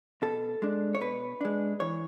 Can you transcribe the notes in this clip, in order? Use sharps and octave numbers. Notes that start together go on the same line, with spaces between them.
B2 A4
G#3 D4
C#5
B2 B4
G#3 D4
E3 C#5